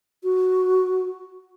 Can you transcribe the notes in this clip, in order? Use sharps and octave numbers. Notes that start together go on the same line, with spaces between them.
F#4